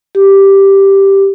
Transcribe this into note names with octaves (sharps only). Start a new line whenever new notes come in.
G4